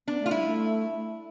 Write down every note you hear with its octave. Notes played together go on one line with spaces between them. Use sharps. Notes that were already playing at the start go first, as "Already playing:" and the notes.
B3 D4
A3
F4
G3 E4
A3